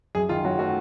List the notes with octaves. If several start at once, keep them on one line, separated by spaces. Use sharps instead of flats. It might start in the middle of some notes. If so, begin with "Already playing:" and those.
F#2 G#4
D#3 F4
F#3 F#4
A3 F#4